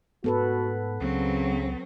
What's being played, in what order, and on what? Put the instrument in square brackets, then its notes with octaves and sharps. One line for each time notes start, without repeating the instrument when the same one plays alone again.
[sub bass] G#2 [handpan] B3 A4 B4 [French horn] F#4
[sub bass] C#2 [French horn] C#3 [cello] F#3 C4